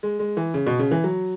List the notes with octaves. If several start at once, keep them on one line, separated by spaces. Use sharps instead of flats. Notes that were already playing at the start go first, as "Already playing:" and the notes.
G#3
G#3
E3
C#3
B2
C#3
E3
F#3